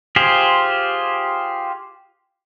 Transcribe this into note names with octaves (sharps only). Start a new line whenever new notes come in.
F4 G4 G#4 C5